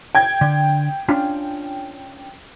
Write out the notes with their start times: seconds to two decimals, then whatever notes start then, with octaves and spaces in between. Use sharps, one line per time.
0.15 G5 G#6
0.41 D3
1.08 C#4 D4 F4